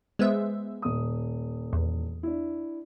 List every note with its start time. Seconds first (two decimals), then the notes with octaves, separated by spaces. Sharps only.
0.19 G#3 B3 C5 E5
0.82 D#1 D#6
1.73 E2
2.23 D4 E4